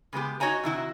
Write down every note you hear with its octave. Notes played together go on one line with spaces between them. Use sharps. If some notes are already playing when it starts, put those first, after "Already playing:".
C#3 G#3 B3 G4
D#4 F#4 C#5 D#5 G#5 A#5
C3 D#3 E4 F#4